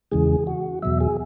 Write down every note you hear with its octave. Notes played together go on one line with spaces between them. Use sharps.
E2 C#3 E3 G#3 G#4
F#4
E2 B2 F#3 E5
G#4